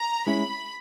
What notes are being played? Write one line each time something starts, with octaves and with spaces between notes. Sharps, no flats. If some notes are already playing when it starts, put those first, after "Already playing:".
Already playing: A#5
G#3 C#4 E4 B5